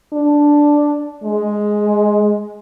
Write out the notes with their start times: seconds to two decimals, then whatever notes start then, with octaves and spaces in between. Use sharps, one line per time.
0.13 D4
1.23 G#3